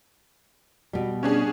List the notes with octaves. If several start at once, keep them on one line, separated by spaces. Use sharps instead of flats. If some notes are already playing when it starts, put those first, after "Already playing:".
B2 G3
C#4 D4 G#4